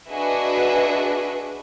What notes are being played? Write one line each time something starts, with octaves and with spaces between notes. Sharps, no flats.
D4 F#4 G#4 B4 D#5 E5